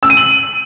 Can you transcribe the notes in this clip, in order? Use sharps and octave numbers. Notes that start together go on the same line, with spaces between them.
E6
D#7
F#7